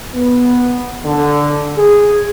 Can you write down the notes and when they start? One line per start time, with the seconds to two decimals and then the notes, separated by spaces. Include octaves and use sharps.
0.15 B3
1.05 D3
1.78 G#4